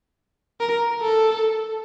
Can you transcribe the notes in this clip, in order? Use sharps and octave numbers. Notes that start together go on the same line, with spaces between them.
A#4
A4